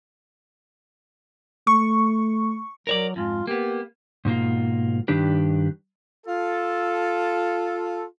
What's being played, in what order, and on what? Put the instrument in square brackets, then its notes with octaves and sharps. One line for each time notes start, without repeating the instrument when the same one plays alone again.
[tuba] A3 [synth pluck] C#6
[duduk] F#3 [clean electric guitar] A#4 C#5 D5
[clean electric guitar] F2 G#2 [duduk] F4
[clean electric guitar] A#3 B3 [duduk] G4
[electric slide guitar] G#2 B2 A#3 F4
G2 D#3 D4 G4 B4
[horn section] F4 A4